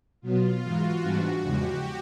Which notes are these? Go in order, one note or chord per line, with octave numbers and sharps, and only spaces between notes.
B2 F#3 B3 F4
G#2 E3 G#3 F#4
G#2 E3 G3 B3 D4
E2 C#3 F3 G#3 G4